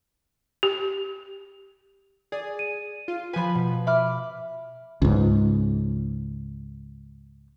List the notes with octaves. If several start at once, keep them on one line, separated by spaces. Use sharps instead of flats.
G4
G#4 D5
D#7
F4
F3 B4 G#5 B5
B2
E5 B5 D6 F6
C#2 G#2